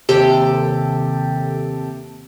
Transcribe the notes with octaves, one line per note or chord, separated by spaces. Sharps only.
D#2 C3 G4 A4 D7